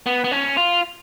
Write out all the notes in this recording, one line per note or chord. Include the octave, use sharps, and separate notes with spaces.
B3
B3
C#4
F4